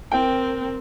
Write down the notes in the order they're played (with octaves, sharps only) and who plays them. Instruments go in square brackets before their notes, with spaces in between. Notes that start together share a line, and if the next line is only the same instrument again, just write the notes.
[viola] C4 A#4 [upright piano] G5